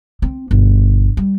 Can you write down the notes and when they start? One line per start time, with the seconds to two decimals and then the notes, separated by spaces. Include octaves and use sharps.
0.22 C4
0.51 G1 B2
1.17 G3